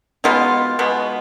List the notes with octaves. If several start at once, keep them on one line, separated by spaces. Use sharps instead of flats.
B2 G#3 B3 D#4 F4
B2 G#3 B3